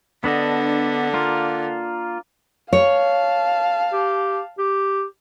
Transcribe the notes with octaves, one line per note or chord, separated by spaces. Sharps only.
D3 B3 D4 D#5
A#3 F4
C#5 F5 A5
G4
G4